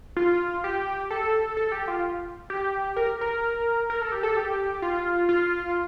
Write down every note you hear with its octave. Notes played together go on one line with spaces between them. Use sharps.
F4
G4
A4
A4
G4
F4
G4
A#4
A#4
A#4
A4
G4
A4
G4
F4
F4